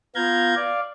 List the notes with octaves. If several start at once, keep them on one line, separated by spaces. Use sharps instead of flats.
B3 F4 F5 A#5 G6 G#6
D5 F5